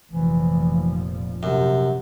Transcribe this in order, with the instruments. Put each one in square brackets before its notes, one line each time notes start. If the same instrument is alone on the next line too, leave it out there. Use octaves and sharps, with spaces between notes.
[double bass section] F1 A#2 F3 [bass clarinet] E3
[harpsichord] F#2 [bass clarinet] C3